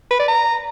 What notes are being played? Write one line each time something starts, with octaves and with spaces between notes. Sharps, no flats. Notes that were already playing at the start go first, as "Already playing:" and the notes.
B4
D5
A#5